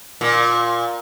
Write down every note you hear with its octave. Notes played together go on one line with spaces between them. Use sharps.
A#2